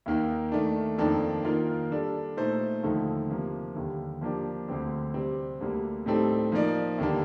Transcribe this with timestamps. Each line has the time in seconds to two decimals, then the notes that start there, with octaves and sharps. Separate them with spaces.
0.06 D#2 D#3 A#3
0.52 D#3 A3 D4
0.98 F2 D#3 A#3 D4 A4
1.45 D#3 A#3 F4 A#4
1.91 G3 D4 A4
2.37 A#2 A3 D#4 A4 C5
2.83 D#2 D3 F3 A3 D#4
3.30 C3 F3 A#3
3.76 D#2 D3 G3
4.21 F3 A#3 D4 G4
4.68 D2 D3 G3 C4 G4
5.14 C3 G3 C4
5.60 D2 D3 G3 A#3
6.06 A2 G3 C4 D#4 A4
6.52 F3 A#3 D#4 A#4 D5
6.98 D#2 D3 G3 A#3 D4